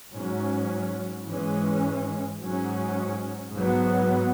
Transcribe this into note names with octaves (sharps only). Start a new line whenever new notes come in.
G#2 F#3 C#4
G#2 E3 G#3 C#4
G#2 F#3 C#4
G#2 F#3 B3